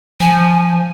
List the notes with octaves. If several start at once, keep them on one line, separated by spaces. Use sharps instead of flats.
F3 G#5